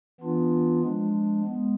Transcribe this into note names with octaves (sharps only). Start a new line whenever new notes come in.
E3 B3 D4 F4
F3 G#3 D4
G#3 B3